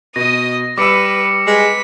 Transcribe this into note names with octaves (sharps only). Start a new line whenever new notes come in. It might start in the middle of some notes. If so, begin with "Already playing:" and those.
B2 D#5 D#6 A#6
G3 B4 D6 E6 C#7 D7
G#3 B4 B6 C#7